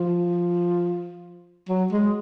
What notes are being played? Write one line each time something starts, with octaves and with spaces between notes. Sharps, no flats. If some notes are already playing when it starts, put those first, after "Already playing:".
Already playing: F3
F#3
G#3